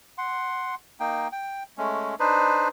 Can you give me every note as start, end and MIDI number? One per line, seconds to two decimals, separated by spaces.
0.18 0.75 78
0.18 0.75 84
1.00 1.28 58
1.00 1.28 63
1.00 1.28 79
1.32 1.63 79
1.78 2.15 56
1.78 2.15 57
1.78 2.15 61
2.20 2.68 62
2.20 2.68 63
2.20 2.68 71
2.20 2.68 72